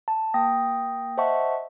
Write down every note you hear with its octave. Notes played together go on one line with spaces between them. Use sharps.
A5
A#3 G5 D#6 A#6
C5 D#5 E5 F#5 A5 C#6